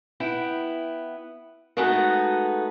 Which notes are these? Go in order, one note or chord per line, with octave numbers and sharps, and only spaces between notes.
B3 E4 G5
G#3 A3 B3 D#4 F#4 A4